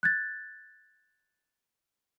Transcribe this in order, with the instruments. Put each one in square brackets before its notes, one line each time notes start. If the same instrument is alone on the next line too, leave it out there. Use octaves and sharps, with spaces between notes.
[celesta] F#6 G#6 A6